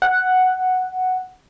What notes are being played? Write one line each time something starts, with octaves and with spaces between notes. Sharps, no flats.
F#5